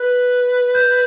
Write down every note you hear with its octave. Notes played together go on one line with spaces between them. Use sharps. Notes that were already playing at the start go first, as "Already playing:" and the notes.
Already playing: B4 F#6
G6